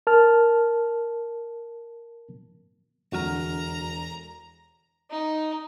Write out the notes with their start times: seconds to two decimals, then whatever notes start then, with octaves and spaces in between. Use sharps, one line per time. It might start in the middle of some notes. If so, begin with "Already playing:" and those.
0.07 A#4 A5 F6
3.12 E1 F2 D3 F#4 A#5 F6
5.10 D#4